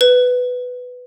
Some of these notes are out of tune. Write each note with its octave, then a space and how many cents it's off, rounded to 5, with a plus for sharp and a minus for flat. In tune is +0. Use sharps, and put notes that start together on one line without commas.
B4 +10